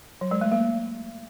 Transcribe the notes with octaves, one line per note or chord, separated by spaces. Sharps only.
F#3
G#3
A3
A#3